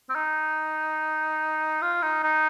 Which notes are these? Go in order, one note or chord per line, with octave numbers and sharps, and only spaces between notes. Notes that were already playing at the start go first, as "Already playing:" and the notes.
C4
D#4
F4
D#4
D#4